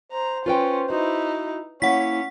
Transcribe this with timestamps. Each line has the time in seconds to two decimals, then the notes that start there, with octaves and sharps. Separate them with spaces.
0.12 C5 A#5
0.46 C#4 F4 B4 G5
0.90 D#4 E4 F#4
1.82 A#3 C#4 E4 C#5 F#5 B6